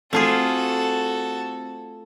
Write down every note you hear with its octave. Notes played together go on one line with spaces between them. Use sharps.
A3 C4 F4 F#4 G#4 A4 A5 G#6